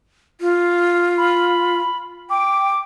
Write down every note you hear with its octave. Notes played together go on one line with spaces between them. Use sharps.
F4
B5
G5 D6